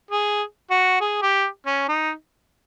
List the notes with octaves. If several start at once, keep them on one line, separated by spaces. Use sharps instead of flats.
G#4
F#4
G#4
G4
C#4
D#4